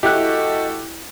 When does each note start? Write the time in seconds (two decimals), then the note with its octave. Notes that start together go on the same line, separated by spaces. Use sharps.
0.03 A3 E4 F#4 G4 A4 D#5 F#6